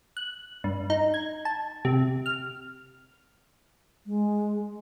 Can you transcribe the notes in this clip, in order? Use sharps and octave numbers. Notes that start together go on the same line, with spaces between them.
F#6
G2
D#4
G#6
A5
C3
F6
G#3